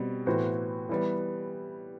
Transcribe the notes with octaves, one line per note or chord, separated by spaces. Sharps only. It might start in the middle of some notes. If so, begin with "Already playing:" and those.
Already playing: B2 G3 C4
A2 E3 B3 F#4 C5
E3 G3 B3